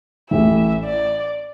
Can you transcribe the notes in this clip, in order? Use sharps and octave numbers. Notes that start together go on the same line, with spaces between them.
A1 A2 E3 E5
D5